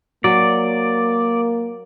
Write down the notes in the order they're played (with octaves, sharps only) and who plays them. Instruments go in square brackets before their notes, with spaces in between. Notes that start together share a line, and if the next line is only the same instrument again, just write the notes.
[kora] F#3 [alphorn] A#3 [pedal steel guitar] D5